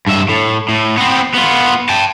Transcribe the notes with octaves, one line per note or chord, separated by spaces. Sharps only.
G2 E5
A2
A2
B3 C4
B3 F4
G5 A5